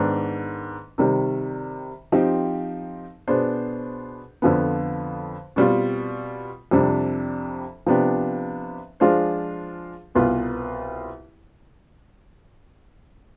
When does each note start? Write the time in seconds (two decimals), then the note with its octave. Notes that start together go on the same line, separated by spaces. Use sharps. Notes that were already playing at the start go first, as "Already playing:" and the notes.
Already playing: G#2 D#3 B3 D4
0.98 C3 D#3 G3
2.12 F3 C4 D#4 G4
3.28 B2 B3 D4 G#4 C5
4.42 F2 D3 F3 B3
5.56 B2 G3 C4 F4
6.71 F2 C3 G3 D4
7.86 C3 F3 B3 D4 G4
9.00 F3 G#3 D4 F4 C5
10.15 C2 B2 B3 F4 B4